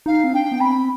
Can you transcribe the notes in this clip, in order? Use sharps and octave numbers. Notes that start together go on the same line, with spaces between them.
D#4 F5
C4
D4 G5
B3
C4 B5